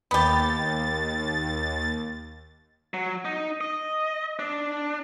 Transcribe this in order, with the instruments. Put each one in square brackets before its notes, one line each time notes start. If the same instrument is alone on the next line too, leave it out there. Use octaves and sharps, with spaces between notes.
[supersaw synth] D#2 A6 [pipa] B3 G4
[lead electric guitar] F#3
D#4
D#5
D4